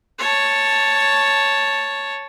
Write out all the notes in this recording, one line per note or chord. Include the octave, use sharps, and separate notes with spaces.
C#5 A5